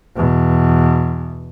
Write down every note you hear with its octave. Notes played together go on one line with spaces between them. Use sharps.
E2 B2